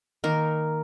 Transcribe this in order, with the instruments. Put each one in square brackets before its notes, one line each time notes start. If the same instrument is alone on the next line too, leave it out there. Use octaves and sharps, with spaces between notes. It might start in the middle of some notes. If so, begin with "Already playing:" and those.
[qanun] D#3 A#3 A#4